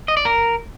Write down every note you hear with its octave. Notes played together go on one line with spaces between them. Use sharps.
D#5
D5
A#4